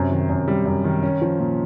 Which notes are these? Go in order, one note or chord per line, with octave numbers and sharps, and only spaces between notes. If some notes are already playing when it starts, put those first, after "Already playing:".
Already playing: F#2 C3
D#3
F#2
G3
F#2
D#3
C#4
F3
A#2